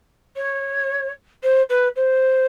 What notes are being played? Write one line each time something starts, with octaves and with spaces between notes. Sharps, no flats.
C#5
C5
B4
C5